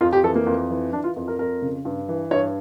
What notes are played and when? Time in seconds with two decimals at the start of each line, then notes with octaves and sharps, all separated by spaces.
0.01 F2 F4
0.13 G4
0.23 E3 A4
0.35 A#3
0.47 F2
0.70 E3
0.93 E3 D4
1.04 F4
1.16 F2
1.28 A#4
1.39 F2 A#4
1.62 C#3
1.85 G2
2.08 E3
2.31 G2 C#5